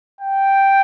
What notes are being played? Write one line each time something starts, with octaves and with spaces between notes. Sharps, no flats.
G5